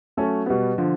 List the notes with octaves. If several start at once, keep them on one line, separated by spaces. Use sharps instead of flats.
F#3 A3 C#4 F#4 A4
B2 G3 B3
D3 F3